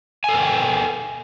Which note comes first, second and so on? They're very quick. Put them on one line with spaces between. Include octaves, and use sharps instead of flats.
G#5 A4 A#4 G5